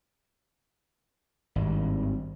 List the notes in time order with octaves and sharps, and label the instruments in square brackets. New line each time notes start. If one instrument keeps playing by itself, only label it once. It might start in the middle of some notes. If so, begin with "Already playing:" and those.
[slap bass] G#1 G2